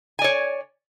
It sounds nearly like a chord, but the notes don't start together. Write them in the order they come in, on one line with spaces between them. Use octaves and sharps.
G#5 D5 C#5